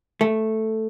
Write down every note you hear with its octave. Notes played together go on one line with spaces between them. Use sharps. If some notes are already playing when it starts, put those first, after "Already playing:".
A3